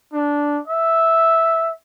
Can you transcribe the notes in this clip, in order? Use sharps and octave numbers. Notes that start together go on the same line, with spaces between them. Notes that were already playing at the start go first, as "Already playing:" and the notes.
D4
E5